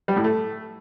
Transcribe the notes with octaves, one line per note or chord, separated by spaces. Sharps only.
G3
A2
A3